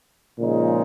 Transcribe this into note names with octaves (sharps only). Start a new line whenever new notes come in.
A#2 C#3 F3 G#3 D#4